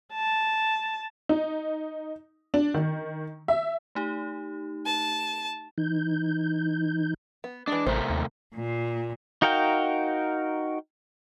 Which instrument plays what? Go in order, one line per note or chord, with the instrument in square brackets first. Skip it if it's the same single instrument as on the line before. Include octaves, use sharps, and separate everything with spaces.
[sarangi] A5
[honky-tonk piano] D#4
D4
D#3
E5
[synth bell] A3 D#4 G4
[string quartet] A5
[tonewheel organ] E3 D#4 G6
[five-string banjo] B3
[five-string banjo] E3 G#3 [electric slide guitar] D4
[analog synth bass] A1 [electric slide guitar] C3 A3 A#4 [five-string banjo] C5
[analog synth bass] D#2
[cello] A#2
[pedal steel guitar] D#4 F#4 A#4 F5 G5